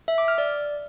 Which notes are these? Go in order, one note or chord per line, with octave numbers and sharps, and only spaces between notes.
E5
D6
F6
D5